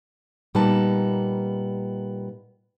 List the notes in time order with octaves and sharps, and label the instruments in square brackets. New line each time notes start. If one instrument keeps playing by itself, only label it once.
[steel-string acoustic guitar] A#2 G3 A#3 B3 D#4 A5